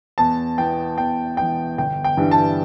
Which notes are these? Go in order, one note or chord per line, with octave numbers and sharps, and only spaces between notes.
E2 A5
E3 B3 G5
E2 G5
E3 B3 G5
G1 G5
G5
G2 E3 G3 D4
A5